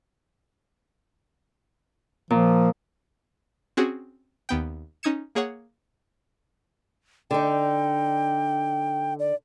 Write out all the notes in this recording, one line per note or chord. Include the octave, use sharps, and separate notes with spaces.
A#2 F3
C4 C#4 F#4 G#4
D#2 B3 G5
C#4 D#4 D#6 G#6 C#7 E7
A#3 G#4 C#5 F#5
D3 D#4 G5
D5